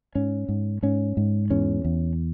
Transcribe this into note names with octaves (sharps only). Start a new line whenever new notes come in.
G#2 C#4
G#2
G#2 C#4
G#2
E2 C#4
E2